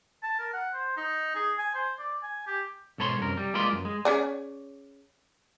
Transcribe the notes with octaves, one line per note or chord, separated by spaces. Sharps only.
A5
A#4
F#5
C5
D#4
G#4
G#5
C5
D5
G#5
G4
B1 G#2 A4 C#5 B5 C6
C2 F#2 A#4
G3
G#3 A#3 F4 B4 D5 C6
F#2
G#3
C#4 G#4 D5